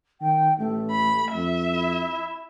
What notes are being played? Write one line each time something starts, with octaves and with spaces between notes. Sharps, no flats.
D#3 G5
A1 A3
B5
F2 E5
E4